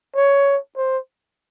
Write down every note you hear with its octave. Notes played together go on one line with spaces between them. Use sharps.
C#5
C5